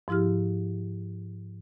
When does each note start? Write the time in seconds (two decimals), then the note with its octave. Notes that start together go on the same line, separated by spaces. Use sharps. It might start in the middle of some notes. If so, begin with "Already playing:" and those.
0.08 G#2 F3 E4 G4 F6